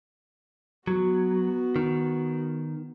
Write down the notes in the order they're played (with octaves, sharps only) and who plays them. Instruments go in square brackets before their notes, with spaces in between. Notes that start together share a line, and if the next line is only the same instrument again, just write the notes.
[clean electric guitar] F#3 [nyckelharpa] B3 F#4
[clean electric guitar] D#3